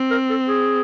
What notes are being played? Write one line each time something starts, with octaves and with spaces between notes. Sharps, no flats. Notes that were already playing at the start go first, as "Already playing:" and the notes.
Already playing: C4
A#4
A4
G#4